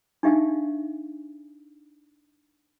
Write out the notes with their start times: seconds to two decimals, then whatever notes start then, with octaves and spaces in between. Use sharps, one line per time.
0.23 D4 D#4 G4 E5 F5 G#5